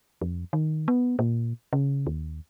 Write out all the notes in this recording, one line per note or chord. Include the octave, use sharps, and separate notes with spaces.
F2
D#3
B3
A#2
C#3
D#2